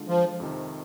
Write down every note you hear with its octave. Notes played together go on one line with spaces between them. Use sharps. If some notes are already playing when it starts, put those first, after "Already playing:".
Already playing: D3 G#3 D4 F4
F3
F2 C3 D#3